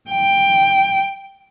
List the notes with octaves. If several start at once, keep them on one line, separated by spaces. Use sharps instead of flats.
G5